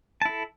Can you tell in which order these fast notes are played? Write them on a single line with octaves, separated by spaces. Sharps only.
A5 E4 A4